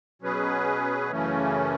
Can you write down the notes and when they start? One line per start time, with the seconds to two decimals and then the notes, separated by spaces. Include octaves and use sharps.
0.22 B2 F#3 C#4 G#4 B4
1.11 F#2 C#3 E3 A3 C#4